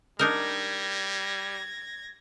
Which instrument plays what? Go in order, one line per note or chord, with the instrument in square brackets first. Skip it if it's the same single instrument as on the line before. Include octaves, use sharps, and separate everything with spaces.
[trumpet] G3 [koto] D4 D#4 A#4 [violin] G#6 A#6